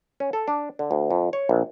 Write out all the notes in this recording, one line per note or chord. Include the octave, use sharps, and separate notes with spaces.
C#4
A4
D4
D3
D2
F2
C#5
A#1